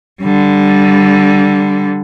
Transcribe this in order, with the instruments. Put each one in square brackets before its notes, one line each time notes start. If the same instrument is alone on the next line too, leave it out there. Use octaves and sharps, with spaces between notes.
[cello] D3 G3